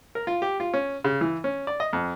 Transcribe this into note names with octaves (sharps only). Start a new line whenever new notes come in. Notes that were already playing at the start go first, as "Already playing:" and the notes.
A#4
F4
G4
F4
C#4
C#3
E3
C#4
D5
D#5
F2